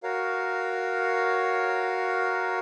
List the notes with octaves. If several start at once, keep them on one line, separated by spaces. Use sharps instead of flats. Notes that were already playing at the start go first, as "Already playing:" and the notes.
F#4 A#4 C#5 F5